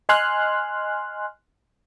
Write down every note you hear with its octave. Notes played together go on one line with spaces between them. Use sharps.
D#5 G#5 C6 F6 F#6